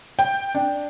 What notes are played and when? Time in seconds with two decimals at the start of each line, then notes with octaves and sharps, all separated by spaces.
0.19 G5
0.55 D4